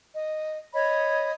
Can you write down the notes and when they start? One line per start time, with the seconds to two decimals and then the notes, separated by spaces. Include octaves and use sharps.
0.13 D#5
0.73 C#5 D#5 B5